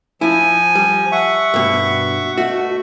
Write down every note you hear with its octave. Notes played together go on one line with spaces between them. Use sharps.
F3 E4 G#5
G3
E5 F#5 C#6
G2 B2
B2 A3 F#4 E5